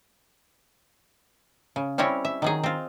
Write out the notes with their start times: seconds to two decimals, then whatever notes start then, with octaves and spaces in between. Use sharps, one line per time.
1.76 C#3
1.98 G3 C4 C#4 E4 C#5
2.25 E5
2.42 D#3 F#3 G#4
2.64 C4 F4